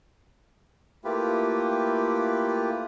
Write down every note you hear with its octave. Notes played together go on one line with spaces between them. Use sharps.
A3 A#3 E4 F4 G4 B4